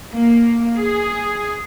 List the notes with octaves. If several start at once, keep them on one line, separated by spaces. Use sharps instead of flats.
A#3
G#4